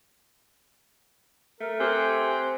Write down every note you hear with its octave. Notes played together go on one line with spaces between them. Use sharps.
A3 A#4
C4 G4 G#5 F#6